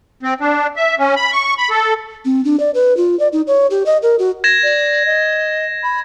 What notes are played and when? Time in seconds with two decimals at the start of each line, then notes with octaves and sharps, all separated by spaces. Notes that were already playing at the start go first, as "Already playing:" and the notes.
0.23 C4
0.41 D4
0.76 E5
0.99 C#4
1.16 B5
1.32 C#6
1.58 B5
1.70 A4
2.25 C4
2.45 D4
2.60 D5
2.74 B4
2.97 F4
3.19 D5
3.33 D#4
3.47 C#5
3.71 G4
3.86 D#5
4.02 A#4
4.19 F#4
4.44 G#6 A#6 E7
4.63 D5
5.06 D#5
5.83 B5